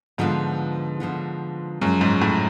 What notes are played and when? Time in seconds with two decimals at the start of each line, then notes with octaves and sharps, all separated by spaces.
0.18 G#2 D3 F3 B3 F4
1.00 D3 F3 B3 F4
1.81 F#2 C#3 F3 G#3
2.01 G#2
2.21 A2